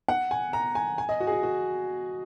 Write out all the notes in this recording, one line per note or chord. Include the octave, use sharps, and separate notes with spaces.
F#5
G#5
A#5
G#5
G#5
D#5
F#4
G#4
F#4
F#4